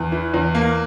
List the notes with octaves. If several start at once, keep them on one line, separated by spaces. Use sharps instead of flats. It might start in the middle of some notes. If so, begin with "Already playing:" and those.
Already playing: E2
E3
E2
A#3